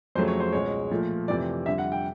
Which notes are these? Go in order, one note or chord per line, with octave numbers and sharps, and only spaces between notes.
F2 C#3 F#3 A3 C5
C#5
C5
C#2 B2 G#3 C#5
A#2 F3 A3
F2 C3 E3 A3 D5
F2 D3 G3 E5
F#5
G5